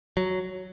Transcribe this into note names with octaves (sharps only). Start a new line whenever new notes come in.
F#3